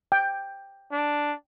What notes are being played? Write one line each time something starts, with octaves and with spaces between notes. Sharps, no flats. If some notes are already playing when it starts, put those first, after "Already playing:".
G5
D4